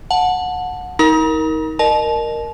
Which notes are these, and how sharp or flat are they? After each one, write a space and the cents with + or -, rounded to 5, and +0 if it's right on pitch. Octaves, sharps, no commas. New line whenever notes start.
F#5 -20 A5 +0
D#4 +35 A#4 +0 A#5 +40
A#4 +0 D#5 -35 A5 -30